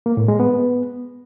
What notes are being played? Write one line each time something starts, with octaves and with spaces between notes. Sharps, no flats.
A#3
A2
G#3
B3